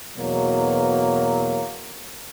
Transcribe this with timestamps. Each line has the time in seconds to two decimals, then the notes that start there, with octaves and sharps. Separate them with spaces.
0.17 E2 B2 F#3 A#3